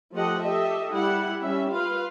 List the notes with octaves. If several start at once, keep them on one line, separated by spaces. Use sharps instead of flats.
F3 A3 G4 A4 D#5 F#5
G4 A4 D#5 E5
G3 E4 F#5
G3 C#4 E5
F4 B4 F5